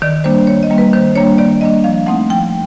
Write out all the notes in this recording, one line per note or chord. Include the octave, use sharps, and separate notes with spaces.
D#3 D5
G3 A#3 D4 C5
D#3 C#5
D#5
G3 A#3 D4
B4
D#3 C5
G3 A#3 D4 C#5
D#3 D5
G3 A#3 D4 D#5
F3 F5
A3 C4 D#4 F#5
F3 G5